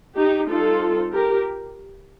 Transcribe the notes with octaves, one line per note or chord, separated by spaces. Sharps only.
D#4 G4
G3 C4 D#4 F4 A4
G4 A#4